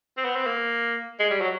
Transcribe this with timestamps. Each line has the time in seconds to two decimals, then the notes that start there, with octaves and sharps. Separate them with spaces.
0.17 C4
0.25 B3
0.36 C4
0.46 A#3
1.20 G#3
1.31 G3
1.41 F#3